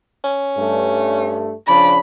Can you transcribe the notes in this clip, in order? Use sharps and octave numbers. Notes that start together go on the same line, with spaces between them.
C#4
G2 A3
C#3 F3 D4 D5 B5